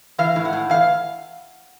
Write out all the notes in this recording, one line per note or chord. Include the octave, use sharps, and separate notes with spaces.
E3 F5
A2
F#5
A2
E3 F5